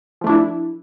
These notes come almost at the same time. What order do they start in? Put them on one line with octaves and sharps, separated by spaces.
F3 A3 D4 E4